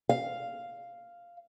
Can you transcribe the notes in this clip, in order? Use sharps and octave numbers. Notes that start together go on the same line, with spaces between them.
F5